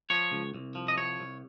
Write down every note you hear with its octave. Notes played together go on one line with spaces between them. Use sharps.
F3 C#5
C#2
C2
F3
D#5
C2 C#5
C2